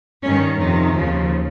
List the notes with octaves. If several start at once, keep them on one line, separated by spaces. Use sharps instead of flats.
G2 D#3 C#4
F2 C3 D#3 D#4
D#2 C#3 F3